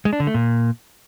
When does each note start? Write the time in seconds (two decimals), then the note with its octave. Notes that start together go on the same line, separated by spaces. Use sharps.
0.05 G#3
0.13 D4
0.20 D3
0.27 A3
0.34 A#2